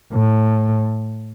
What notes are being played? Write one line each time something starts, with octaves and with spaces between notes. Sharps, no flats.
A2